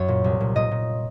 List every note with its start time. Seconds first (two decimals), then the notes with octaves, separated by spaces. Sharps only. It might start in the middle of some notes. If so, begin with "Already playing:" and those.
Already playing: F#2 F#3 C#5
0.08 A#2
0.24 C2
0.40 A#2
0.56 A#2 D#5
0.71 A#2